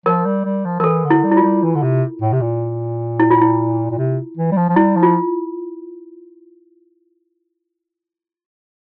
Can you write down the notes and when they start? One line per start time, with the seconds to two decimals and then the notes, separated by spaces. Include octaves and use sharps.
0.05 F3 A#4
0.25 G3
0.45 G3
0.65 F3
0.80 F3 A#4
0.84 E3 A4
1.05 D3
1.10 E4
1.24 G3
1.32 E4
1.37 F4
1.43 G3
1.63 E3
1.75 D3
1.82 C3
2.22 A2
2.32 C3
2.41 A#2
3.20 E4
3.31 F4
3.41 E4
3.90 A#2
3.98 C3
4.37 E3
4.52 G3
4.57 F3
4.69 F3
4.76 G3 E4
4.96 F3
5.03 F4